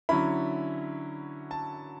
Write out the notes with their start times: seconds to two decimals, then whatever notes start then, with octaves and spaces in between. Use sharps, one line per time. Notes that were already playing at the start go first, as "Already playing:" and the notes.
0.09 D3 F#3 C#4 E4 B5
1.51 A5